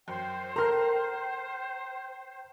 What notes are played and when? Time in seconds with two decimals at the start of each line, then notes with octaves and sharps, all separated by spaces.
0.08 F#2 C5 G5
0.56 A4 A#4 A#5 C6 F6